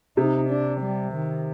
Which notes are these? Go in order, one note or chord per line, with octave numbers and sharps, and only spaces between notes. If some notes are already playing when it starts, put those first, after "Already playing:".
C3 D#4
D4
G3
D#3